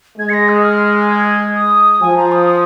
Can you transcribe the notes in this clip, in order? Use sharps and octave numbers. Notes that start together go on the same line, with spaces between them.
G#3 G#6
C#7
A#6
D#6
F6
G#6
D#6
F3 G#5
A#5
D#6
D#6